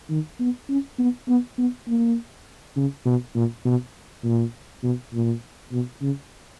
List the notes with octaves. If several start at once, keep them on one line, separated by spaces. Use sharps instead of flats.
D#3
B3
C#4
B3
B3
B3
A#3
C#3
B2
A#2
B2
A#2
B2
A#2
B2
C#3